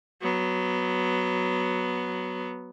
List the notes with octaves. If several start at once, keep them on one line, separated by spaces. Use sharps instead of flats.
F#3 B3